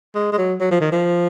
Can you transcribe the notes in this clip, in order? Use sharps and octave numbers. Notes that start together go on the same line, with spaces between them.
G#3
G#3
F#3
F#3
F3
D#3
F3